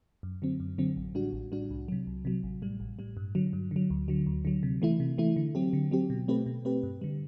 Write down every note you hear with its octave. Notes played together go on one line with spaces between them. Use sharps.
F#2
D3 F#3 C4
F#2
D3 F#3 C4
A1
A2 G3 D4 F#4
A1
A2 G3 D4 F#4
C2
C3 F#3
C2
C3 F#3
A1
A2 G3
A1
A2 G3
G2
D3 F#3
G2
D3 F#3
D2
D3 F#3
D2
D3 F#3
C3
E3 A3 E4
C3
E3 A3 E4
D3
F#3 C4 G4
D3
F#3 C4 G4
B2
A3 C4 G4 B4
B2
A3 C4 G4 B4
G2
D3 G3